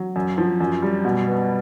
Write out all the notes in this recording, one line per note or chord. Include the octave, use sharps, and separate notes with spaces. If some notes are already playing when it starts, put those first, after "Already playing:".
Already playing: F#3
F#2
F3
F#2
G3
B2
B3